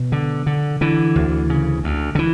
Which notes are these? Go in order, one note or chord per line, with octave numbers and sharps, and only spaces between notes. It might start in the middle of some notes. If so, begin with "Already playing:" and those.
Already playing: B2
D3
D3
D3 E3
D2
C#3
D2
D3
E3